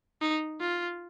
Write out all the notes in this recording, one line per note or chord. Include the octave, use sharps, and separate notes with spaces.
D#4
F4